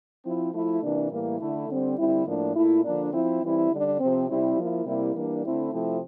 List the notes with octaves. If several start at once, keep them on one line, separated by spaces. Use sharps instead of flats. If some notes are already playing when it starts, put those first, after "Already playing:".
F3 C4 E4
F3 A3 E4
C3 E3 A#3 D4
A2 E3 G3 A#3
D3 A3 E4
D3 G3 C4
D3 G3 C4 E4
A2 F3 A#3 D4
A#2 A3 E4
D3 F3 A#3 D4
F3 C4 E4
E3 G3 C4 E4
D3 G3 D4
C3 F3 C4
C3 G3 C4 E4
F3 A#3 E4
C3 G3 A#3 E4
E3 G3 A#3 D4
D3 A3 C4 E4
C3 F3 A3 C4 E4